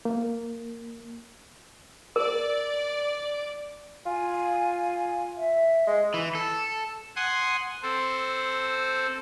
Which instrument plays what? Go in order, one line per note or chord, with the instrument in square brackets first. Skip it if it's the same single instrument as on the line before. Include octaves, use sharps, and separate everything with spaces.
[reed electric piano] A#3
[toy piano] A#4 [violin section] D5
[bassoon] F4 [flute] G#5
[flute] E5
[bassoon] G#3
[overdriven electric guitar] E3
A4
[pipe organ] F#5 G#5 C6 D#6
C4 A4 C5